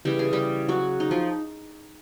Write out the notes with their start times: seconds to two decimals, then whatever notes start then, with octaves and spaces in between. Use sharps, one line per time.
0.05 C#3 E3 G3 G4
0.19 G#4
0.33 G3 G4
0.69 F#3 F#4
1.00 D#4
1.11 F3 F4